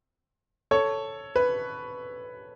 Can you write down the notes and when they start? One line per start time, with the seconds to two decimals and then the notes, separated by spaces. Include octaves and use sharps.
0.71 A4 C#5
1.36 B4